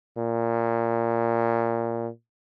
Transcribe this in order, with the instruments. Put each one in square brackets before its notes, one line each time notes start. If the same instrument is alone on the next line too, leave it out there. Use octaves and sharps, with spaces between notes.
[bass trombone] A#2